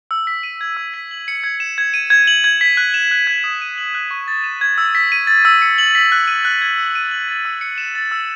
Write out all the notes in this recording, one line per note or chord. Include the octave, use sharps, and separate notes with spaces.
E6
B6
D#7
G#6
E6
B6
F#7
C#7
G#6
E7
G#6
D#7
G#6
F#7
G#6
B6
F#6
E7
F#6
G#6
D#6
D#7
F#7
F#6
C#6
A6
E7
G#6
E6
B6
D#7
A6
E6
C#7
F#7
B6
F#6
D#7
F#6
G#6
E6
D#7
F#7
A6
E6
C#7
E7
A6
E6